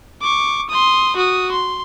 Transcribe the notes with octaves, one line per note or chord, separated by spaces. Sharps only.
C#6 D6
C6 D#6
F#4 D#6
C6